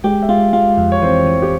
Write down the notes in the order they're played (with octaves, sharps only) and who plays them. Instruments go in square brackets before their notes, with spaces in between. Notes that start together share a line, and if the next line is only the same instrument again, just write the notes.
[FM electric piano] G#3 [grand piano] G4 G5
[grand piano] E5
[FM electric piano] G#3 [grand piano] F4 F5
[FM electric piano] G#3 [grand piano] F4 F5
[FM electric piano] F2
[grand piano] C#5
[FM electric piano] E3 [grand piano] C4 C5
[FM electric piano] E3
[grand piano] G4